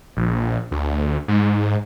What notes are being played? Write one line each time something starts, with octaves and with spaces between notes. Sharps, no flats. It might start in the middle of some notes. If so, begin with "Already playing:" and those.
A#1
D2
G#2